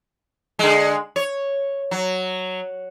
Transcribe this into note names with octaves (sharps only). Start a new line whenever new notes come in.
D3 G#3
C#5
F#3